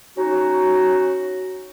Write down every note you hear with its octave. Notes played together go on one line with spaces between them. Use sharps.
C#4 D#4 F#4